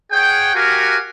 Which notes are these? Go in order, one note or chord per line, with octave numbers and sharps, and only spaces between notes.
G#4 C#5 F#5 G5
F#4 G4 A#4 F5 F#5 G#5